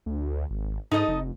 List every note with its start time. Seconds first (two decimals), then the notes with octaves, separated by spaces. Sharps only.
0.06 D2
0.51 G#1
0.91 G#2 D#4 A4 D#5
1.08 F1